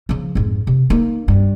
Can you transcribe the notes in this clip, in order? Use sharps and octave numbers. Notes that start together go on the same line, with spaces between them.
C#3 F3
F2 G#2
C3
A#3 D#4
G2